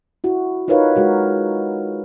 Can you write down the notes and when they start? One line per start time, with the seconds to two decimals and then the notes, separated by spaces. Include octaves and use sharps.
0.24 E4 F#4
0.68 D#4 F4 A#4 B4 C#5 F5
0.96 G#3 F#4 A#4